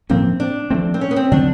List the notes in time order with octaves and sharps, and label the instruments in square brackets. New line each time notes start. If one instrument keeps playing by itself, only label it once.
[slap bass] A2 F3 A#3 C#4 [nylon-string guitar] C4
[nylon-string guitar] D4
[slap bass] F3 A3 C4
[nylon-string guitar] C4
C#4
B3
C4
[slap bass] D3 F#3 A3 [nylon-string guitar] D4